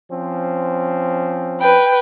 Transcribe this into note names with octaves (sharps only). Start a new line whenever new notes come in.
F3 C4 C#4
B4 G5